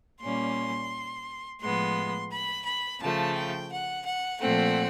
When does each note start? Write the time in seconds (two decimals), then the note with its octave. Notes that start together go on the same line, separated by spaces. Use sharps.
0.21 A#2 G3 A#3 C#4 C6
1.61 A2 F3 G#3 B3 C6
2.31 B5
2.65 B5
3.01 C#3 F3 A3 A5
3.36 G5
3.71 F#5
4.06 F#5
4.40 A#2 F3 A3 C4 F#5